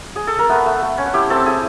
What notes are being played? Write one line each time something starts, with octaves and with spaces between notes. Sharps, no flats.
G#4
A4
A#4
A3 B3 B4
A3
A3
C#4
F#5
E4 G4 G5
C4 A4 A5
E4 G#4 G#5